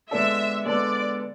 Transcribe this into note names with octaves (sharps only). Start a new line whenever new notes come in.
D3 G#3 B3 D4 A4 E5
D3 G#3 B3 D4 A4 D5